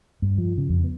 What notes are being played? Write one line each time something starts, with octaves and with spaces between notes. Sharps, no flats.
G2
F3
C#3
F2
B3